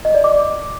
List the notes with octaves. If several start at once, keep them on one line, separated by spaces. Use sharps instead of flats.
D#5
D5
D6